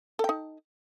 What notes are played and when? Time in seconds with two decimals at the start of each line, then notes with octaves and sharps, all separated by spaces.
0.19 A4
0.24 G5
0.29 D#4